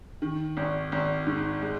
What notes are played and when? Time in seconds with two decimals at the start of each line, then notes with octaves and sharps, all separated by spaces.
0.22 D#3
0.57 G#1
0.92 G#1
1.27 G#2
1.62 G#3